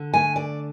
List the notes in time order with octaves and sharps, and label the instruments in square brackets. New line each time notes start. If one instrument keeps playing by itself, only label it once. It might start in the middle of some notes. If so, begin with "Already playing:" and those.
Already playing: [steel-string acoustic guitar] D3
A3 G#5
D5